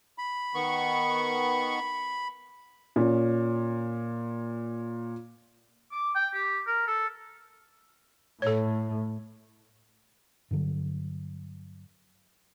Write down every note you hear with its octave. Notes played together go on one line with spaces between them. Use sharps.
B5
D#3 B3 C#6
A#2 C#4
D6
G5
G4
A#4
A4
A2 A4 C#5
G2 D3 F#3